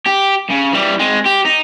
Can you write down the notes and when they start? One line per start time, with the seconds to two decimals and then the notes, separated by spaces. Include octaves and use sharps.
0.06 G4
0.50 C#3
0.73 E3 G3
1.00 G#3 C4
1.26 G4
1.45 D#4